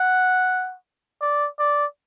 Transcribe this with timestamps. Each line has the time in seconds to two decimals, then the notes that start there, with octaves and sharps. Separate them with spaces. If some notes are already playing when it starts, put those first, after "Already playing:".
Already playing: F#5
1.21 D5
1.59 D5